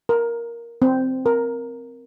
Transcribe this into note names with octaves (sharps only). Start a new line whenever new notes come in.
A#4
C4
A#4